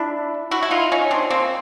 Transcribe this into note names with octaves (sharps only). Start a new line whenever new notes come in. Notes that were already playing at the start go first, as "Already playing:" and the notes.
Already playing: D4 E4
E4 F#4
E4
D#4 F4
C#4 D#4
C4 D4
A#3 C4